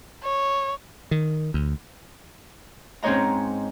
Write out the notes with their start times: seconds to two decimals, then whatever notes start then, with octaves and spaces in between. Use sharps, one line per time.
0.23 C#5
1.11 D#3
1.54 D2
3.03 G#2 C4 C#4 C#5 D#5 A#5